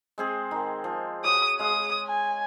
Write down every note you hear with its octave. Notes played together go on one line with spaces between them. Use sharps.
G#3 C4 G#4
D#3
F3
F#4 C#5 D#6
G#3 F5 D#6
G#5